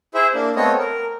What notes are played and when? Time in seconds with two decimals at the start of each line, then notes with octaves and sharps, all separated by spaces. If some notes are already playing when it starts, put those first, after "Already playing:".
0.14 E4 G#4 C5 E5
0.34 A#3 D4
0.56 A3 B3 C4 C#5 D#5
0.79 A#4